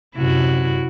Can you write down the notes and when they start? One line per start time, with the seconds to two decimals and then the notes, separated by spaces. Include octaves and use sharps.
0.15 F#2 C3 E4 F#4